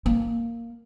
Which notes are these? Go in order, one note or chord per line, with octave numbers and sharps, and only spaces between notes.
A#3